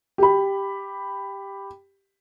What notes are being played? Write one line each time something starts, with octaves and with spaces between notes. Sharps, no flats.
G4 B5